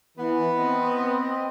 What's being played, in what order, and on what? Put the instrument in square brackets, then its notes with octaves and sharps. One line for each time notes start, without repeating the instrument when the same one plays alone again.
[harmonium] E3 [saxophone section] B3
[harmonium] C4 D#5